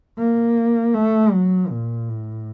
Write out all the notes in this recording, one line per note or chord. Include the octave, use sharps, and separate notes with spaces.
A#3
A3
F#3
A#2
A2